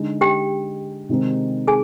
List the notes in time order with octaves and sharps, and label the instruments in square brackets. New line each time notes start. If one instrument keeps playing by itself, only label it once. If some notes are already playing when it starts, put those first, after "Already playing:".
Already playing: [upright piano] D3 G#3 D#4
[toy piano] G4 G5
[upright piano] C3 D#3 G#3 C4 D#4
[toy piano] G#4 G#5